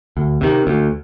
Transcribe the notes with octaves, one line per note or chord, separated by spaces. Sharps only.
D2
C3 D#3
D2